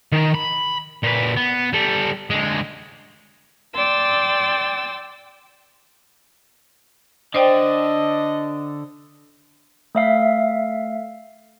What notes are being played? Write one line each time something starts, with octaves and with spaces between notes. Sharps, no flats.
D#3
B5
A#2 B4
B3
G3 A4
D3 G#3
D5 G5 C6 E6 A6
D3 C5 D5 D#5 G5
A3 E5 F5